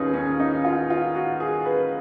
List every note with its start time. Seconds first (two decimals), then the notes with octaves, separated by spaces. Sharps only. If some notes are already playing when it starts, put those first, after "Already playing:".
Already playing: D#2 C#4 D#4 F4 G#4 B4
0.14 C#4
0.40 D#4
0.65 F4
0.90 F4
1.15 F#4
1.40 G#4
1.66 B4